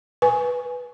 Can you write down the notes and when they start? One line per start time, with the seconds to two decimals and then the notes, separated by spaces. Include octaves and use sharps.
0.22 B4 G#5